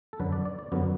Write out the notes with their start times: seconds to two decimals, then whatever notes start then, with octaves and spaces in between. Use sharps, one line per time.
0.13 A4
0.20 F#2 D3 F#3 B4
0.32 D5
0.45 D5
0.59 D5
0.72 F#2 D3 F#3 B3